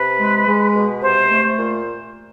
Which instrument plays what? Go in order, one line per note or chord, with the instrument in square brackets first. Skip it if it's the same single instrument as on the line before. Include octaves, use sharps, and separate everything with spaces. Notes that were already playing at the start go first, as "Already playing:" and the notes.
Already playing: [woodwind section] C3 B4
G#3
G#3
B2
C3 C5
A3
A#2